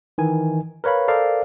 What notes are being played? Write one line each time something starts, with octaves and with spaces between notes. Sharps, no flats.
D#3 E3 G#5
A#4 B4 C#5 F5 B5
A4 A#4 C5 D5 F5